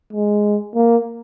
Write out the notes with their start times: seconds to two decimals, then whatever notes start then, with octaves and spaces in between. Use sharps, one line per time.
0.13 G#3
0.75 A#3